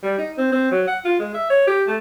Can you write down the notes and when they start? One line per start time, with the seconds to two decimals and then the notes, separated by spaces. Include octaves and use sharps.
0.03 G3
0.18 D#4
0.38 C4
0.52 C4
0.71 F#3
0.87 F#5
1.05 F4
1.19 G#3
1.34 E5
1.50 C#5
1.67 G4
1.87 A3